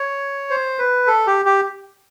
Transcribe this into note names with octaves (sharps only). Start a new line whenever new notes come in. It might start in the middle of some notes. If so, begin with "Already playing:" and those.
Already playing: C#5
C5
B4
A4
G4
G4